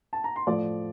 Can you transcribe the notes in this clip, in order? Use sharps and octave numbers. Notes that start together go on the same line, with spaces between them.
A5
A#5
C6
A2 F3 A3 D5 D6